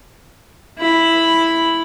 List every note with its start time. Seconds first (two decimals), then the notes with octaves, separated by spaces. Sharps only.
0.79 E4 B5